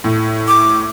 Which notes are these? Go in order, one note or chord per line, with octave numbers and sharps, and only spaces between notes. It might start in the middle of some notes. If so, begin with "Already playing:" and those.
A2
D6